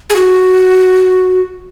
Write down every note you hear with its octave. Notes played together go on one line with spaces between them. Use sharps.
G#4
F#4